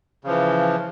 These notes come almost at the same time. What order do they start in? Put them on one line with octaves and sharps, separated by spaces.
C#3 F3 E3